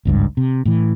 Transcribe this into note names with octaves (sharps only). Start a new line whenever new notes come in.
G#1 C#2 G2
C3
A2 E3